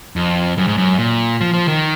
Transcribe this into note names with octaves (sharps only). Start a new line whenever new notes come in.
F2
F#2
G#2
F#2
A#2
F3
F3
D#3